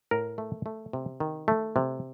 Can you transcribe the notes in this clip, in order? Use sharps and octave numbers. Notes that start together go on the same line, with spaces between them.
A2 A#4
A3
A3
C3
D#3
A3
C3